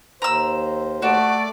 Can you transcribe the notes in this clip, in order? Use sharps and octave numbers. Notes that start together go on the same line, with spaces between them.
D#2 C5 A#5 E6
A3 F#4 D5